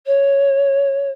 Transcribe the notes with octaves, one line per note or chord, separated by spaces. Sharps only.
C#5